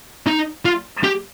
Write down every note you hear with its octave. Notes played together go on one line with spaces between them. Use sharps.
D#4
F4
G4